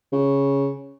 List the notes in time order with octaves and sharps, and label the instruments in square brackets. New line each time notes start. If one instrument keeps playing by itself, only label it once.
[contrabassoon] C#3